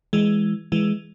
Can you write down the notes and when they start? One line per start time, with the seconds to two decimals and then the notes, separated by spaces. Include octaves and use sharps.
0.13 E3 G#3
0.72 E3 G#3